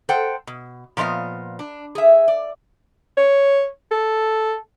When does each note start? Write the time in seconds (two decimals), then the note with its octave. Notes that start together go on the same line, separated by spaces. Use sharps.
0.09 A4 C5 F#5 G5
0.47 B2
0.97 A#2 F3 B3 D#5 F5
1.59 D4
1.95 G#4 E5
2.28 D5
3.17 C#5
3.91 A4